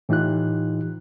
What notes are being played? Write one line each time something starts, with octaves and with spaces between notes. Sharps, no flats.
A2 E3 D#4 F4 G4 F#6